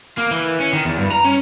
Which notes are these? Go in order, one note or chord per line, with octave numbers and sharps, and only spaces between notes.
A#3
E3
C#4
D#3
E2
G2
A#5
C#4